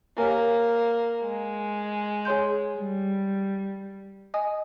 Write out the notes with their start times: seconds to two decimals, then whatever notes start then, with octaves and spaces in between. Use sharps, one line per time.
0.18 A#3 G4 C#5 G#5
1.22 G#3
2.25 G#4 C#5 G#5 C6 G6
2.78 G3
4.34 D#5 G#5 D#6